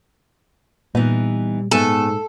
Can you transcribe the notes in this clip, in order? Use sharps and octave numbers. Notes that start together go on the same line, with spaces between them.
A#2 E3 G3 B3 D#4
G#2 A3 B3 A4 G#5